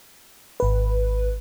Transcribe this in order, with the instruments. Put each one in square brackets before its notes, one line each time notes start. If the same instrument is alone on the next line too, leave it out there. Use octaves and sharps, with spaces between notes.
[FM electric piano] G#1 B4